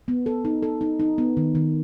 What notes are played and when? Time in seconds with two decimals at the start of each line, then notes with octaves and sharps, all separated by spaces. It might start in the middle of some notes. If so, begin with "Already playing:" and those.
0.08 B3
0.26 A4
0.45 D#4
0.62 A4
0.81 D#4
1.00 D#4
1.18 B3
1.37 D#3
1.55 D#3